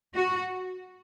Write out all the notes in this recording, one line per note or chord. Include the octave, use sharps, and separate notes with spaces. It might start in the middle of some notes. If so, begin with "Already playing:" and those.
F#4